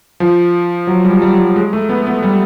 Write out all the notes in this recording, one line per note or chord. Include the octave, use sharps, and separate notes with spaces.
F3
F#3
G3
G3
G3
G#3
A3
B3
B3
G3